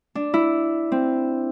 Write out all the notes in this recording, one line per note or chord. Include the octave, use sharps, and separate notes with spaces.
D4
E4
C4